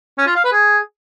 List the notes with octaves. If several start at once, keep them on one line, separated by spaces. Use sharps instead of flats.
C#4
F4
F5
B4
G#4